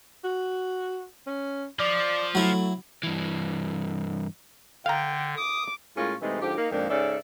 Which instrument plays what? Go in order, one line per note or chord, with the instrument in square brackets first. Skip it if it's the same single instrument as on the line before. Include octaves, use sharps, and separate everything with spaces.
[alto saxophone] F#4
C#4
[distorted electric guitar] F3 [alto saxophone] D5
[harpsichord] F#3 E4 [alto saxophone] A3
[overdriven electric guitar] G2 E3
[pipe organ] D3 [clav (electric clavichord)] F5 A#5 [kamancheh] G5
[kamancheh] D6 [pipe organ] D#6
[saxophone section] A2 G#3 A#3 C#4 F4
G#2 C3 E3 G#3 A3 D#4
G#2 D3 F3 G4
A#3 D#4
F2 A#2 D#3 G#3 A#3 D4
G#2 C#3 C#4 A4 D5 E5